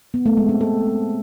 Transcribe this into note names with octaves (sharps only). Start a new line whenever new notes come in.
B3
A3
G#3
C4
A4